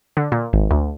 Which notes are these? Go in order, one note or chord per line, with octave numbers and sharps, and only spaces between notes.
D3
A#2
G#1
D2